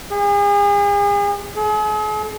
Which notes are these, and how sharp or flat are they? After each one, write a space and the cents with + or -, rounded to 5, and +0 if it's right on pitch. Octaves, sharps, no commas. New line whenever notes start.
G#4 -40
G#4 +40